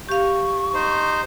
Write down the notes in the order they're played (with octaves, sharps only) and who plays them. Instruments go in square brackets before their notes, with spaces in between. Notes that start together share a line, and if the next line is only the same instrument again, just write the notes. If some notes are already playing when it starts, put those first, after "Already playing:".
[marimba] G4 F5 [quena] C#6
[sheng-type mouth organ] D#4 C5